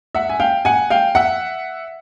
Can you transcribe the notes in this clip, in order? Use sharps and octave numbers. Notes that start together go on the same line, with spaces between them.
E5 F#5
G#5
F5 G5
F#5 G#5
F5 G5
E5 F#5